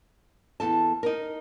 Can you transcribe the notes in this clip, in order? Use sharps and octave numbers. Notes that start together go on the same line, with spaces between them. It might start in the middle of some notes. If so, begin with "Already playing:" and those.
E2 A4 A5
D#4 A#4